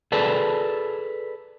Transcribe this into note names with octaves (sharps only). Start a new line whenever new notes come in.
G#4 A4 B4 D5 A5